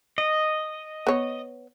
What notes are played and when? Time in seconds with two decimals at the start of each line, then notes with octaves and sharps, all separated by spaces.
0.18 D#5
1.07 B3 C#5